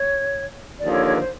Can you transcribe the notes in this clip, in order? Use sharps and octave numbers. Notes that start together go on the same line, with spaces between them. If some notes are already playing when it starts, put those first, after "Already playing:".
Already playing: C#5
D#2 D3 F3 D5
C#5
C#5
B4
C5